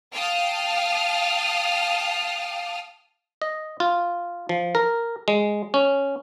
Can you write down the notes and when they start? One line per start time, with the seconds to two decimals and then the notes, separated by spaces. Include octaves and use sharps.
0.13 F5 G5 A5 D#6 F6
3.42 D#5
3.80 F4
4.49 F3
4.75 A#4
5.28 G#3
5.74 C#4